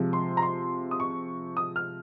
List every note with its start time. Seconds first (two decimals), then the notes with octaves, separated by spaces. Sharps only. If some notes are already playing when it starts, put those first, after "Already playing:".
Already playing: C3 F3 G#3
0.13 C6
0.37 A#5
0.42 C6
0.91 D#6
1.00 C#6
1.57 D#6
1.76 F6